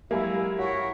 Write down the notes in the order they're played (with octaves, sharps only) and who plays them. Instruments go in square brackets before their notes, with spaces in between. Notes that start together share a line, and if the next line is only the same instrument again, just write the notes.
[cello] F#3 G#3 [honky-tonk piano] A#3 G#5 [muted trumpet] E4 [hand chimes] G4
[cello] E4 A#4 [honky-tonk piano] F#4 [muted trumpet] C#5